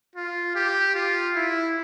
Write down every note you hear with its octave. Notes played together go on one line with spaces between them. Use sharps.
F4
G4
F4
E4